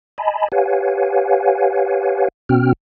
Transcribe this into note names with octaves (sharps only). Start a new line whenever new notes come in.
D#5 G#5 A5 B5
G4 B4 C#5 F5 F#5 G#5
B2 B3 C#4 F#4 G5 F6